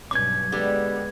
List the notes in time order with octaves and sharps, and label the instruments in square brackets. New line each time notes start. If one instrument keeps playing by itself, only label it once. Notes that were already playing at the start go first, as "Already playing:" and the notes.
[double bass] B1 G2 [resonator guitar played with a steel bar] B2 C#4 [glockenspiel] D6 G#6
[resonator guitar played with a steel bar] D3 G3 G4 [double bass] G#3 B3